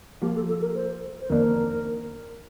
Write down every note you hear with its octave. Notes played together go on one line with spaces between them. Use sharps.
F3 A#3 F4 G4
A4
A4
A#4
C5
C5
F2 D#3 A#3 D4 A#4